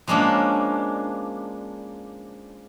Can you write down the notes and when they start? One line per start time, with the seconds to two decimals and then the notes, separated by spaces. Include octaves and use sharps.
0.07 F3 G#3 A#3 C#4 D4